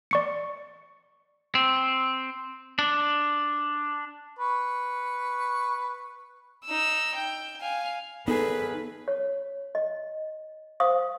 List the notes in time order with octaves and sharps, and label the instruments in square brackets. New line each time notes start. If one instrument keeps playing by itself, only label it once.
[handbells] D5 C#6 C#7
[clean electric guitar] C4
D4
[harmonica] B4 C#6
[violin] D#4 E6
G5
F5 G#5
[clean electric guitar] D#3 G#4 [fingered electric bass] B3 [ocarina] A4 [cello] B4
[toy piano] C#5
D#5
C5 F5 D#6